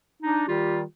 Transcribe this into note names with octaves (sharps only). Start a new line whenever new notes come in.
D4 D#4
D#3 G3 F4 G4